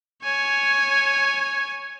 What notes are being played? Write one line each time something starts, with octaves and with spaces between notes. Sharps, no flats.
C#5 G#5